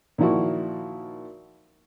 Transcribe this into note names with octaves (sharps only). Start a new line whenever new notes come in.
A#2 D#3 F3 E4 F#4